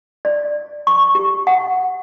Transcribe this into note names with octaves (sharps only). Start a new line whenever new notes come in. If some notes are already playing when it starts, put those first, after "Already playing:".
D5
C#6
G4
F#5